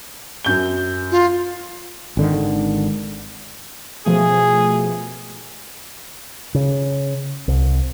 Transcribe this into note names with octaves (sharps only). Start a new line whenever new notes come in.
F#2 G6 G7
F4
G#1 D3 D#3
B2 F3 A3 G#4
C#3
C2